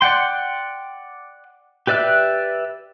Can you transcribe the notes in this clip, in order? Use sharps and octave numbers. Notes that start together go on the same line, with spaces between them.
D5 F#5 G5 C6
G4 B4 D5 E5 F#6